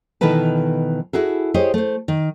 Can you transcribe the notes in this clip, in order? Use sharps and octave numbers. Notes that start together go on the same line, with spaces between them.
B2 D#3 E3 A4 B4 A5
E4 F#4 G#4 A4
G4 G#4 C5 C#5 D#5
A3 C5
D#3